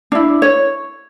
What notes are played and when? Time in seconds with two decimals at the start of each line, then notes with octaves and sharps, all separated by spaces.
0.12 D4 E4
0.42 C#5